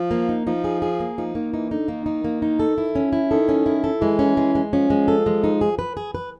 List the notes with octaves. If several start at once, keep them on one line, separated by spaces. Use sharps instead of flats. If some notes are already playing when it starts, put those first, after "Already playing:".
Already playing: F3
A#3
D#4
F3 D#4
G#4
G#4
A#3
F3 D#4
D#3 A#3
E3 D#4
D3 D#4
D#3 A#3
D#4
A#3
D#4
A4
E4
C#4
E4
D#3 A4
C#4
E4
A4
E3 G#3
C#4
G#3
G#3
F3 C#4
G#3
A4
G#3
D#4
G#4
B4
G#4
B4